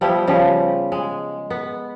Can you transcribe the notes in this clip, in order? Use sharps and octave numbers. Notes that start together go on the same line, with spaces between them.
F3 G3 B3 E4
C#3 F3 G3
G#3
B3